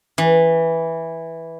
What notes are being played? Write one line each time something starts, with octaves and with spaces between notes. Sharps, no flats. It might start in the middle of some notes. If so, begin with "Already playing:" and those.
E3